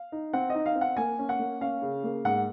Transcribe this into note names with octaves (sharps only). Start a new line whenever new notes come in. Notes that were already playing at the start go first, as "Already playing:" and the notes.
Already playing: F5
D#4
C4 F#5
D#4 D#5
F5
C4
F#5
A#3 G#5
C#4
F#5
A#3
C#4 F5
C#3
A#3
G#2 F#5